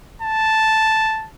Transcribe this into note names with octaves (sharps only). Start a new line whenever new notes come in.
A5